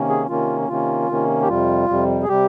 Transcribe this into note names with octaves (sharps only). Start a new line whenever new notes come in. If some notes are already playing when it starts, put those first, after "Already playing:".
Already playing: C3 D#3 A#3 C#4
G#4
C3 D#3 A#3 C#4 F4
C3 D#3 A#3 C#4 F4
C3 D#3 A#3 C#4
G4
F2 C3 G3 F4
F2 C3 G3
G#4
C3 G3 G4